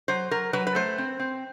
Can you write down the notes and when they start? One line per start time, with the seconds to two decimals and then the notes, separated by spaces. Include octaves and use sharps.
0.08 F#3 C5
0.31 F#3 A#4
0.53 F#3 B4
0.67 B4
0.75 A3 C5
0.98 C4
1.20 C4